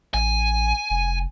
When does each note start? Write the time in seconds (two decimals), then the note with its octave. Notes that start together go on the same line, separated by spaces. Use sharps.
0.14 A1 G#5
0.90 F1